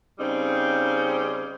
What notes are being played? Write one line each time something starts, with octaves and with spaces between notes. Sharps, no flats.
C#3 G3 C4 D#4